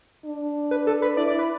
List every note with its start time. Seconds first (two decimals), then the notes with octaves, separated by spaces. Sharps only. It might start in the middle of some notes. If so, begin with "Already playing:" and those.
0.25 D4
0.71 B4
0.87 A4
1.02 B4
1.17 E4 D5
1.27 D5
1.39 B4